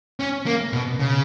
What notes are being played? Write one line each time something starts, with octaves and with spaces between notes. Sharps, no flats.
C#4
A#3
B2
C#3